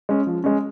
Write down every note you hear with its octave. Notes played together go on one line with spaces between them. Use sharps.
G#3 C#4
F3
G#3 C#4